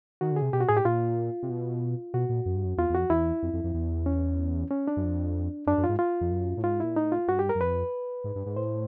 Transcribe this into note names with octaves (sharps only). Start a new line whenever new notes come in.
D#3 F#4
D3
G#4
C3
B2 G4
F#4
A2 G#4
G4
A#2 F4
C3
B2
B2 F#4
A#2
F#2
G2
F#2
E2 F4
E2
F2 F#4
E2 E4
F2
F2
F2
E2
C#4
C#4
D4
F#2
F2
F#2 D4
F#2
F4
G#2
F4
F2
F#2
A2
G#2 F4
A#2 E4
A2 D#4
F4
G2 F#4
G4
A#4
F#2
F2 B4
G#2
G2
G#2
A2 C5